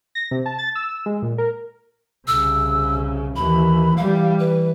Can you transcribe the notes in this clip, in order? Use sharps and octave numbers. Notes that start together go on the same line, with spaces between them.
A#6
C3
A5
A6
E6
G#3
A#2
A#4
C2 C#3 E6
D#2 E3 B5
E3 G3 F5
E3 B4